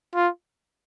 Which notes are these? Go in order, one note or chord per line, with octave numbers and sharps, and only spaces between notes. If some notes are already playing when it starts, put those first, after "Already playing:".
F4